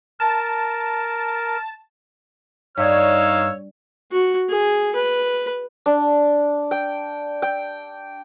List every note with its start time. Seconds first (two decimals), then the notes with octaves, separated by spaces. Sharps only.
0.20 A#4 A5
2.78 G2 D#4 C#5 F5 E6
4.12 F#4
4.49 G#4
4.95 B4
5.86 D4
6.71 G5
7.42 G5